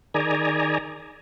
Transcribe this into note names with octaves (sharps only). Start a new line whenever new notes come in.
D#3 G#4 D5 G#5 A#5